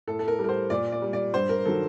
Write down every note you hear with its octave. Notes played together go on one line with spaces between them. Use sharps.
A2 A4
A4
A#4
G3
A#4
C5
A#2 D5
D5
G3
D5
G2 C5
A#4
D#3 F#3 A4